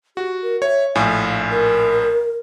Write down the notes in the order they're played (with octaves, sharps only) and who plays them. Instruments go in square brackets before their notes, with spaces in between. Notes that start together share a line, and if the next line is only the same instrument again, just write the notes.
[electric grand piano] F#4 [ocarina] G4
[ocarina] A#4
[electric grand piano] C#5 [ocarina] E5
[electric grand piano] A#1 A2 G#5 [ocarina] F5
[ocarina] A#4